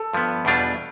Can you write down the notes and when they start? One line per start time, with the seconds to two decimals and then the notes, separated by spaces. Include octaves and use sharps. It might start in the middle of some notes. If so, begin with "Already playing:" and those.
Already playing: A4
0.13 G2 F3 B3
0.45 E2 B2 G3 D4 F4